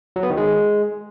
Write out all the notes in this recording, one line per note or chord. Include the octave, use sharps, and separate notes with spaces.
F#3
B3
D#3
G#3